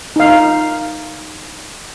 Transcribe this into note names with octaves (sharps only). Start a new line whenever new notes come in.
D#4 F5